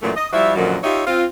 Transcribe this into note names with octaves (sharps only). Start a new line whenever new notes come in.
F#2 A#2 E3 A3
D#5
F3 G3 E4 F#4 E5
F#2 A#2 D3 D#3 F3 F#3
D#4 F4 G4 C#5 E5
C4 F4